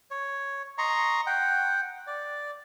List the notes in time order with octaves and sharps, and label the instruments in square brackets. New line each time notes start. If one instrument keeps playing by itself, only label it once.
[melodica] C#5
D#5 A#5 C6 C#6
F#5 G5
D5